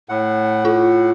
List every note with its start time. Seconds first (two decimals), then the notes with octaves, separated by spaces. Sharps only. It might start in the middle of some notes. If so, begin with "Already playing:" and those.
0.09 A2 F#5
0.65 F4